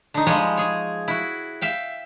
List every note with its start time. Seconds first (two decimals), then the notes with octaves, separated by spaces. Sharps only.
0.14 D3 D#4
0.27 F3 G3 G#3 C#5 D#5
0.57 G#4 C#5
1.08 E4 F#4
1.62 E5 F5 G5